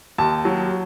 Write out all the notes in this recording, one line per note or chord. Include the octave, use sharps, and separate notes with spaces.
D#2 A5
F#3